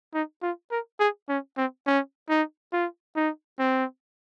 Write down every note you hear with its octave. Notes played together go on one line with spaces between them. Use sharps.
D#4
F4
A#4
G#4
C#4
C4
C#4
D#4
F4
D#4
C4